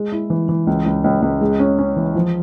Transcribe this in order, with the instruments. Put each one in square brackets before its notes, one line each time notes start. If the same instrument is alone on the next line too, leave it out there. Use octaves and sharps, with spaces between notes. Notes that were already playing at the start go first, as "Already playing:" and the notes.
Already playing: [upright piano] G#3
E4
E3
E3
C#2
C#2
C#2
C#2
G#3
C#4
C#4
E3
F3